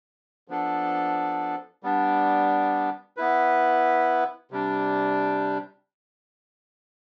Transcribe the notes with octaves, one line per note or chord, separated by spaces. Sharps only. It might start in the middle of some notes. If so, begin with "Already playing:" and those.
F3 B3 D4 A4
G3 B3 D4
B3 E4 B4
C3 G3 D4